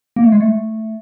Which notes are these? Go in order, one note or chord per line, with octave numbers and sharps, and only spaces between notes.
A#3
A3
G#3
A3